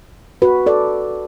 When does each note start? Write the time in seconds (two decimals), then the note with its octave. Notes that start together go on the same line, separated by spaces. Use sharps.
0.42 F#4 B4
0.66 A4 D5